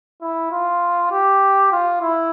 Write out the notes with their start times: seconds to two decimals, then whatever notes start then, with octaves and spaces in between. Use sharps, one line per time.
0.22 E4
0.51 F4
1.11 G4
1.72 F4
2.01 E4